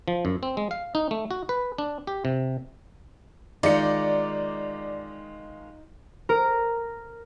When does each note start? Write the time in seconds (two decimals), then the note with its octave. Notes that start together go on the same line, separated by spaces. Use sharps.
0.08 F3
0.25 F#2
0.43 C4
0.57 G#3
0.71 F5
0.95 D#4
1.11 A3
1.31 F#4
1.49 B4
1.78 D4
2.07 G4
2.25 C3
3.63 D#3 G#3 D#4 F4 D5 C#7
6.29 A#4